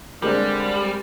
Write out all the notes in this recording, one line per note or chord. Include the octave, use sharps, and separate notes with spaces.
D3 G3 G#3 C4 G4 A#4